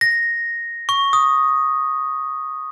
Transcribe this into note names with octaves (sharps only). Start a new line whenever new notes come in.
A#6
C#6
D#6